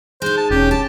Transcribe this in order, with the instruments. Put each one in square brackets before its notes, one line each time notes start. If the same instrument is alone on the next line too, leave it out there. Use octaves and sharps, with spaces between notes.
[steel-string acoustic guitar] G#3 D#4 [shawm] C5
[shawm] A5
[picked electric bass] E1 [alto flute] C#4 [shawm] G4
[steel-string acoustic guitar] G4 [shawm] A5